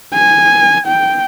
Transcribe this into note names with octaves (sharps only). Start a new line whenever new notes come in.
G#5
G5